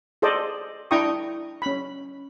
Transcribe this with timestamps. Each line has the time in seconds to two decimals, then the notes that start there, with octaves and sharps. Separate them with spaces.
0.22 G#4 A4 C5 D5 D#5
0.91 D4 E4 G5 A#5 C#6 D#6
1.62 C#4 B5